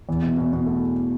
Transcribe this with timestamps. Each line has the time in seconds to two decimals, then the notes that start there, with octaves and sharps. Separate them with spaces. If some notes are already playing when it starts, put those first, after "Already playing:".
0.09 E2
0.22 B2
0.37 B2
0.53 B2
0.66 A3